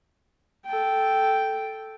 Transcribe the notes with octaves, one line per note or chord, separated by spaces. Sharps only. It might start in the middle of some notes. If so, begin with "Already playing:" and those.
A4 G5